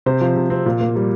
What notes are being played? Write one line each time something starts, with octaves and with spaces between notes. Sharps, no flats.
C3 C5
F3
C3
C4
A#2
A#3
G3